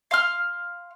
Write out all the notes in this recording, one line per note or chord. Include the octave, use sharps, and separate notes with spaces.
F5 C6 F6